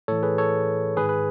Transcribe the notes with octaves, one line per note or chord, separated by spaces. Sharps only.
A2 E3 A4 C#5
G#4 B4
A4 C#5
G#2 D#3 G#4 B4
B4